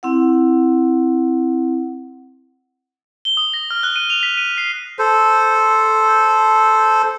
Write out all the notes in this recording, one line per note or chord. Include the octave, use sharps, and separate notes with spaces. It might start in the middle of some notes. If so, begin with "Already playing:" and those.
C4 E4 F#5
G7
D#6
A#6
F6
F#6
D#7
F7
B6
D#7
C7
A4 C5